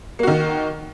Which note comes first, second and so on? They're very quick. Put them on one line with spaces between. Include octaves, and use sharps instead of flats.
A#3 F#4 D#3